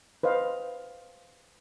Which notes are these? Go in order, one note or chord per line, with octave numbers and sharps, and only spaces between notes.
B4 C5 D#5 F5